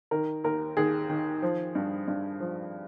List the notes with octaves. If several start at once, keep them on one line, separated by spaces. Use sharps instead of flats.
D#3 A#4
D#2 A#4
D#2 G#4
D#3
F3
G2
G2
F3